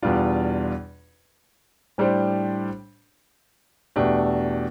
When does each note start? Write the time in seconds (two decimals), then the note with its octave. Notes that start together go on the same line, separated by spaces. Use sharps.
0.02 E2 B2 G3 D4 F4
1.98 A2 G3 D4 G4 C5
3.96 E2 B2 A3 D4 G4